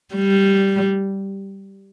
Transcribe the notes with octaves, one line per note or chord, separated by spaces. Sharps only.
G3